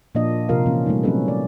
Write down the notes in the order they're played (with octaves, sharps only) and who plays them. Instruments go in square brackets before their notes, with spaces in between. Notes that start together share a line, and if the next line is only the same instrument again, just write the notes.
[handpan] A#2 F3 A#3 D4 F4 D#5
C3 F3 F4 A#4 F5
E3 A#3 C4 C#4
G3 A3 A#3 D#4
F#3 A3 C4 C#4 A4 B4
C4 D5